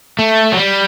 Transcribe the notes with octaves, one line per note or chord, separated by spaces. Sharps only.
A3
F#3
G3